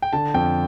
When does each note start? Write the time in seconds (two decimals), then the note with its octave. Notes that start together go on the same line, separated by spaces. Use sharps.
0.02 G5
0.13 D3 A5
0.34 F2 G5